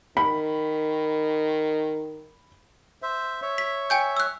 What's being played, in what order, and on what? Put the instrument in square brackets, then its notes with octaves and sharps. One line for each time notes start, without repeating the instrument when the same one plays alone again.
[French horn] D#3 [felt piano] B5
[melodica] C5 E5
C#5 E5
[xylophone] B6
G5 G#5 G6
E6 F#6